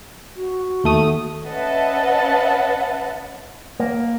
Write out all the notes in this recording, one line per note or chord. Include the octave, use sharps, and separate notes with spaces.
F#4
D#2 A3 D#6
C#4 B4 D#5 E5 F#5 A5
A#3